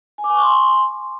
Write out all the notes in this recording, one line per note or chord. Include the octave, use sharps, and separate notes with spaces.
G#5
D6
G#5
C#6
C6